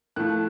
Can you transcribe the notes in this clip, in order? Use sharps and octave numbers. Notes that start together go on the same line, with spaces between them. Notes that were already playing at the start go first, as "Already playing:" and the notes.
A2 F3 A3 F#6